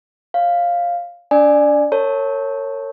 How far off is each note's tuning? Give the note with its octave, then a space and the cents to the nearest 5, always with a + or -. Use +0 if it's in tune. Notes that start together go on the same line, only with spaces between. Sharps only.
C#5 +0 F5 +0
D4 -35 D5 +15 G#5 +0
A#4 -35 C#5 -10 A5 +0